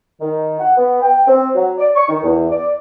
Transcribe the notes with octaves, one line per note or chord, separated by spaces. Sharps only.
D#3
F#5
B3
G5
C4
F#3
D5
C#6
D#3
E2
D5